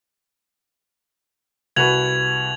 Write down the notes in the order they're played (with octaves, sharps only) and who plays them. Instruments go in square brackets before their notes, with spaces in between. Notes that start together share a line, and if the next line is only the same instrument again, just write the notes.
[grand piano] C2 F#4 B4 [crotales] G#6 F7 F#7